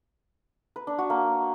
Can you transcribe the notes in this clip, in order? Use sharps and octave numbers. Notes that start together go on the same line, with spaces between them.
B4
D4
F#4
A#3